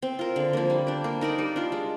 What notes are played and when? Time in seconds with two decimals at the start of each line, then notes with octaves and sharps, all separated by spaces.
0.02 C4
0.19 F4 A#4
0.36 D3
0.53 F3 A#3
0.70 G3
0.87 D4 G4
1.04 A#3
1.21 D#4 A#4 D5
1.38 G3
1.56 D4 F4
1.72 G#3